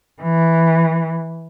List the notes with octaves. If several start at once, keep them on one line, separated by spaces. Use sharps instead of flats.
E3